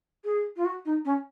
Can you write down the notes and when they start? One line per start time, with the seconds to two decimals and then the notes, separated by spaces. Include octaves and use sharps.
0.25 G#4
0.56 F4
0.65 F#4
0.85 D#4
1.05 C#4